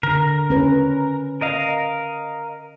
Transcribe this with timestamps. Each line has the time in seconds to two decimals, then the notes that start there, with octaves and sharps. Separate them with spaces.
0.03 D3 A#4
0.50 C#4 B4
1.41 A#4 D#5 F5